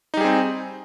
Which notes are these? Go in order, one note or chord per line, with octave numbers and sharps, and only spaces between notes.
G3 C4 D#4 G#4